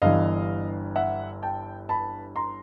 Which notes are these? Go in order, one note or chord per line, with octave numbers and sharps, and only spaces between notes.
G1 G2 E3 D#5 F5
E5 F#5
G5 A5
A5 B5
A#5 C6